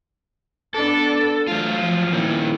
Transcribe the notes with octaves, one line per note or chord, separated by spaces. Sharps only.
B3 D4 A4
F#3 A3 F4
F3
A#2 D#3 E4